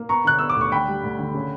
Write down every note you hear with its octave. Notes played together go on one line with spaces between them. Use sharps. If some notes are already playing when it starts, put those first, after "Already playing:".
Already playing: A#3
B3 A#5 C#6
D3 F#6
B3 E6
D6
D2 C#6
D3 G5 B5
G3
D2
D3
C#3